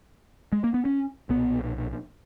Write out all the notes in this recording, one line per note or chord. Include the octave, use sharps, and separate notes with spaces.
G#3
A#3
B3
C#4
B1 A#2 B3